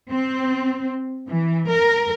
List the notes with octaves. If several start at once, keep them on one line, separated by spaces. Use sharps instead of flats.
C4
E3
A#4